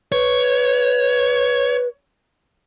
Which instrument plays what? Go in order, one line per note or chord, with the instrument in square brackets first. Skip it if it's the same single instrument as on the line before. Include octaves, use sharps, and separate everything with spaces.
[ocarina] B4 [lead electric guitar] C#5